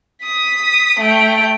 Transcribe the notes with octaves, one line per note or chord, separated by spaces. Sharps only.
D#6 B6
A3 G5